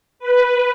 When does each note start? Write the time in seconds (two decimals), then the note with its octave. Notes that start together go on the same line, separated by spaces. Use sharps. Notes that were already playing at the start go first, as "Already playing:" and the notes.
0.19 B4